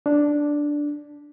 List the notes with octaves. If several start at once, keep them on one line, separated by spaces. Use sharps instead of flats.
D4